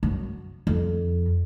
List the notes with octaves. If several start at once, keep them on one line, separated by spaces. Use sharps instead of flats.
F#2
F2